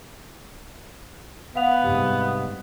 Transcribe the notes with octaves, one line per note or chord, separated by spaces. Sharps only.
B3 F5 F#5 F7
G#2 C3 G3